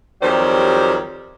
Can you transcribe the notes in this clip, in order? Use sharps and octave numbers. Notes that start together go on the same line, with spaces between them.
F2 D#3 F#3 G3 G4 C5